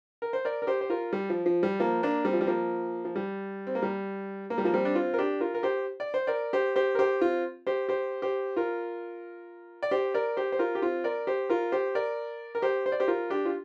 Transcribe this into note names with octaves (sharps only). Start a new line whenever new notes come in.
A#4
C5
A#4 D5
A#4
G4 C5
C5
F4 A#4
G3
F3
F3
G3
F3 A#3
A#3 D4
G3 C4
F3
G3
F3 A#3
F3
G3
C4
A#3
G3
A#3
G3
F3 A#3
G3 C4
D4
C4 F4
A#4
D4 G4
F4 A#4
A#4
G4 C5
D5
C5
A#4 D5
G4 C5
G4 C5
A#4
G4 C5
C4 F4
G4 C5
G4 C5
G4 C5
F4 A#4
D5
G4 C5
A#4 D5
G4 C5
C5
F4 A#4
G4
C4 F4
A#4 D5
G4 C5
F4 A#4
G4 C5
A#4 D5
A#4
G4 C5
C5
D5
G4 C5
F4 A#4
D4 G4
F4